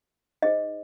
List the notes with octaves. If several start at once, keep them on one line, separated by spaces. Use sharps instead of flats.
D#4 G#4 C5 D#5